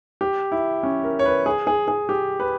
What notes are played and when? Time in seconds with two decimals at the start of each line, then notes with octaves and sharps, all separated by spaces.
0.21 G4
0.52 E4
0.83 C#4
1.04 A#4
1.19 C#5
1.25 B4
1.46 G#4
1.67 G#4
1.88 G#4
2.09 G4
2.40 B4